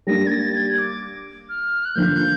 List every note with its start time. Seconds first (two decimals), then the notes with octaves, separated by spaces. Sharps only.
0.07 G3 A#3 D4 A#6
0.27 G#6
0.31 A6
0.55 G#6
0.78 D6
1.49 F6
1.85 F#6
1.95 D3 F3 A#3 G6